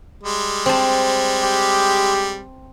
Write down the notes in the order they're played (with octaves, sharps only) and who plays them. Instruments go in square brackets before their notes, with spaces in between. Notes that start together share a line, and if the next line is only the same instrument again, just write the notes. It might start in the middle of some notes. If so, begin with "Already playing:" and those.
[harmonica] G3 G#3
[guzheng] C4 A5
[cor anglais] G4